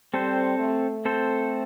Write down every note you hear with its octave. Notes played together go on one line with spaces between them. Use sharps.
G3 C4 A4 C5
A3
C4 A4 C5